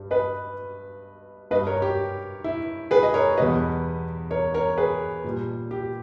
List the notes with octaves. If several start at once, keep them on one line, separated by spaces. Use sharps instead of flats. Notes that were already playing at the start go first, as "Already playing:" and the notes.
Already playing: G2 G3
B4 D#5
G2 G3 B4 D#5
A#4 C#5
G4
E4
G#4 B4
D#5
A#4 C#5
E2 B2 G3 B4 D#5
A#4 C#5
A#4 C#5
G#4 B4
A#2 G3
G4